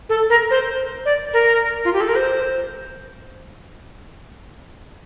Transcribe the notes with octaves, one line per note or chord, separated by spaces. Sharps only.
A4
A#4
C5
D5
A#4
F4
G4
A4
A#4
C5